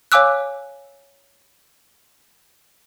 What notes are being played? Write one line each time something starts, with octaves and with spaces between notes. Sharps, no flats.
C#5 F5 G#5 D6 E6 F#6